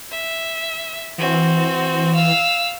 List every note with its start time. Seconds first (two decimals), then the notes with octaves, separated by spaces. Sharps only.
0.11 E5
1.18 E3 C4 F#4
2.15 F5 E6